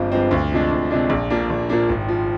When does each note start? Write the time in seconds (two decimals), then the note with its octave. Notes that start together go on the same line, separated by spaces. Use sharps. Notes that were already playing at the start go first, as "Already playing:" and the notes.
Already playing: G1 G2 F3 G#3 C4
0.12 G2 F3 G#3 C4
0.31 D2
0.52 C3 F3 G#3 D4
0.71 D2
0.90 C3 F3 G#3 D4
1.10 A#1
1.30 A#2 F3 A#3 D4
1.50 A#1
1.70 A#2 F3 A#3 D4
1.89 G#1
2.08 F3